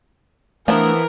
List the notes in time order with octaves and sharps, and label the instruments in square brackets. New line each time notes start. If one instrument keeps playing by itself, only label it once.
[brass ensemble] E3 [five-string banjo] F3 B3 E4 [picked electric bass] A3 D4 [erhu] A#4